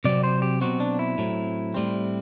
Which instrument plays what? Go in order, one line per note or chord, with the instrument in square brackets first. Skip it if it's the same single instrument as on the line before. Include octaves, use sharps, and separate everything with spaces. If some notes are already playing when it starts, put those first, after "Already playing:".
[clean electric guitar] C3 F#3 C4 D5
C5
G4
B2 F#3 C4 F#4
D4
E4
A2 F#3 C4
A2 G3 C4